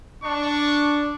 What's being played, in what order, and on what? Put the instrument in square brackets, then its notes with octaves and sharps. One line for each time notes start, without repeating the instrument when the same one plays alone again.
[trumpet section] D4 [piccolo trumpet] C#6